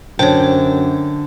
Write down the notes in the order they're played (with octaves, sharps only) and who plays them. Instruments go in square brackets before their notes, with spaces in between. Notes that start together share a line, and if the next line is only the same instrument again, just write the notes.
[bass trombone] F#2 [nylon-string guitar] D3 G5 [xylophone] C5 C#5